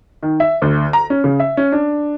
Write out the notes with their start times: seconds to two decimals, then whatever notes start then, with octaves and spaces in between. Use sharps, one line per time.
0.23 D#3
0.40 E5
0.62 D2
0.93 A#5
1.10 C#4
1.24 C#3
1.40 E5
1.57 C#4
1.72 D4